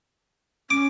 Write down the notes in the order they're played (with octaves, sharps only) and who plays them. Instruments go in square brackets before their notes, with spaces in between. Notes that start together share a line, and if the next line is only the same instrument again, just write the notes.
[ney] C#4 [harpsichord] D6